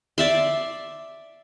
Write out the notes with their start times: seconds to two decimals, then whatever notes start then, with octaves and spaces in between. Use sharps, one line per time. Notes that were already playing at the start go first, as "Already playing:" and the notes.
0.18 D5 E5 C6